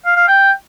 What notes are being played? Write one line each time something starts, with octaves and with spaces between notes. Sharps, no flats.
F5
F5
G5